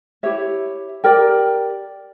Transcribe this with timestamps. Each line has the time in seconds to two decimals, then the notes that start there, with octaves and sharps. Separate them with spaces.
0.23 E4 G4 C#5 E5
1.04 G4 A#4 D5 G5